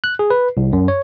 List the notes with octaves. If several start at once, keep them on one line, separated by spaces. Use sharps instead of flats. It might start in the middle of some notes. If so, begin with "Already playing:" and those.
F#6
G#4
B4
C2
F#2
C#5